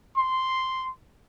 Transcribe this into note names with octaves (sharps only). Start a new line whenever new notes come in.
C6